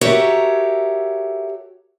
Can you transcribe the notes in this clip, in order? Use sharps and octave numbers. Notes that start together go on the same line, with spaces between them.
F#4 G4 A4 A#4 C#5 E5